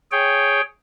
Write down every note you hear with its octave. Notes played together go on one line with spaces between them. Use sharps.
G#4 C#5 G5